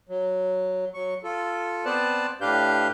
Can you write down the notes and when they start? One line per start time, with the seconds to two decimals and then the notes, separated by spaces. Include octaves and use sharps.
0.09 F#3
0.94 F#3 C#6
1.24 F4 A4
1.85 B3 C4 B4 C5 D5 A5
2.41 A2 D4 G4 B4 F5 G6